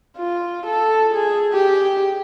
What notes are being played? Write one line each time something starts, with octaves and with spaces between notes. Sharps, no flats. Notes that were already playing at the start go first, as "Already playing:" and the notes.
F4
A4
G#4
G4